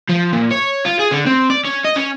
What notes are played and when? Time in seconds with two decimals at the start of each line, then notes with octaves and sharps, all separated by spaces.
0.09 F3
0.33 A#2
0.51 C#5
0.86 F4
1.00 G#4
1.12 D3
1.27 C4
1.50 D5
1.65 C#4
1.85 D#5
1.96 C#4